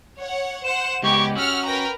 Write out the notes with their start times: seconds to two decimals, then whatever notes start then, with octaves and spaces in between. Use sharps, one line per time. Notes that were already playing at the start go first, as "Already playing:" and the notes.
0.18 C#5 F#5
0.64 C5 F#5 E7
1.03 C#2 G#3 B3 G4 C#6
1.35 C#4 F#4 F#5 E6 F6
1.65 A#4 B4 G5 A#5